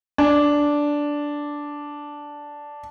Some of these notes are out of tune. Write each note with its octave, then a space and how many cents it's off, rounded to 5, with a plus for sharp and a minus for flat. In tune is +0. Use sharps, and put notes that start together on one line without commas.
D4 -5